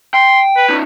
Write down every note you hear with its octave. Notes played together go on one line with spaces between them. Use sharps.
G5 C6
B4
C#4 D#4